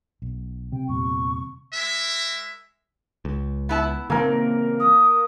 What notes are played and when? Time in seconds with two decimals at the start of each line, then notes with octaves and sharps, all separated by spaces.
0.22 B1
0.72 C3 G5
0.88 E2 A#2 G3 C#6
1.74 G#3 A#4 E5
3.25 C#2
3.69 B3 E4 A5
4.10 A#2 C#3 E3 A#3 C4 A#4
4.79 D#6